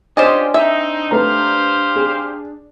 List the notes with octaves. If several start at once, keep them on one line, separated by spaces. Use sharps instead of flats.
C#4 D4 F4 G4 C5 D5 D#5 G#5
C4 D#4 E5
A3 G4 B4 C5 F5 A#5
G#4